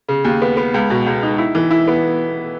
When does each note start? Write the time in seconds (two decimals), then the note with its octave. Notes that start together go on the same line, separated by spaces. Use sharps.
0.08 C#3
0.24 D#2
0.42 B3
0.57 B3
0.74 C#2
0.90 B2
1.06 C#2
1.23 D#4
1.38 E4
1.55 E3
1.71 E4
1.87 B3